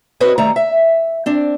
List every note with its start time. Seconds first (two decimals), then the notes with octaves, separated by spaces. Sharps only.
0.20 C4 F#4 B4 C#5 D#5
0.38 D#3 G3 A3 A#5
0.56 E5
1.26 C4 D4